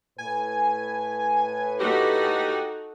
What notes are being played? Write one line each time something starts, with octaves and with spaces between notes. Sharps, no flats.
A2 B4 G#5
D#4 F#4 G4 A4